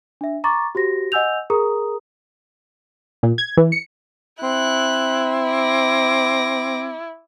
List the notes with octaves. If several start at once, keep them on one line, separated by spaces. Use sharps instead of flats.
D4 E5
A#5 C#6 D6 A6
F#4 G4 C5 A#6
D#5 F#5 G#5 E6 G6 F7
G#4 A#4 A#5 D#6
A#2
G#6
E3
C#7
C4 E4 F#6
D6 A#6